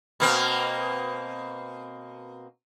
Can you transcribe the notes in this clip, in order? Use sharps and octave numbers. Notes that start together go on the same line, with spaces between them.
B2 A#3 C4